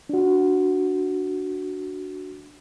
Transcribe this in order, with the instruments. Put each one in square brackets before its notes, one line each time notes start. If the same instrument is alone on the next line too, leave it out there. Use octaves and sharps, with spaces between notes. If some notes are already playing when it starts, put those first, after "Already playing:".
[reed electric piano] D4 F#4